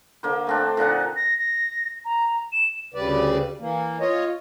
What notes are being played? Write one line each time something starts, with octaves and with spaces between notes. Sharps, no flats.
D3 A#3 C5
A3 C4 D4
A#2 D3 D#4 F#5
A#6
A#6
A#5
E7
D2 C#3 G3 B4 D5
E3 A#3
F4 C#5 D#5